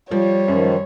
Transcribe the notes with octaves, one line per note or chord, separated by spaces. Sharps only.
F3 G3 C#5
F#2 D#3 F3